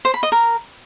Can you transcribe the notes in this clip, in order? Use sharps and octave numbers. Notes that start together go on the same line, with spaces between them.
C5
B5
D#5
A#4